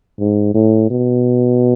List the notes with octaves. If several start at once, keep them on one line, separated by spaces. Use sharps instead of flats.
G#2
A2
B2